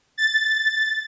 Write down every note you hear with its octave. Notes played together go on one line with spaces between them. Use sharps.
A6